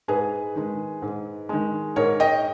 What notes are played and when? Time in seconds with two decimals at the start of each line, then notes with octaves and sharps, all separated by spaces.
0.08 G#2 G#4 B4
0.56 D#3 G#3
1.02 G#2
1.49 D#3 G#3
1.96 G#2 A#4 C#5
2.20 D#5 G5